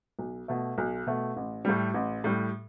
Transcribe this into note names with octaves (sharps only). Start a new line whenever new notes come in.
B1
B2 A3
B1
B2 A3
A1
A2 G3
A1
A2 G3